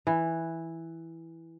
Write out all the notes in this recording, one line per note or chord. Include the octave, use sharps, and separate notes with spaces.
E3